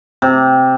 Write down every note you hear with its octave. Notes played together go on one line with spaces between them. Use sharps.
C3